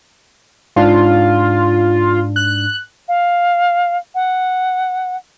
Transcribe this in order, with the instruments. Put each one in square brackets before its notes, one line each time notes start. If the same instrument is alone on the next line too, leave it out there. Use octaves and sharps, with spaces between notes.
[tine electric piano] G#2 D4 [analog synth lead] F4
[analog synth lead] F#6
[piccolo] F5
F#5